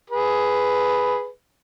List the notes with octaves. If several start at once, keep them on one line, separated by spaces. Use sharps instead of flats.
G#4 B4